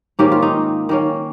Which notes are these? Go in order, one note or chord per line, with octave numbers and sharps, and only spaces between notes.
G#2 D#3 A#3 C#4 G4
F4
D#4
D#3 A#3 C#4